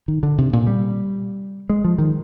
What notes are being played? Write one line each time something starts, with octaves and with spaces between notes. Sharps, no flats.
D#3
D3
C3
A#2
G3
G#3
F3
D#3